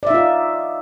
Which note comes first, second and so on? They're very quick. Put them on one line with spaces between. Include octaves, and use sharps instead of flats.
D5 E5 D#4 F4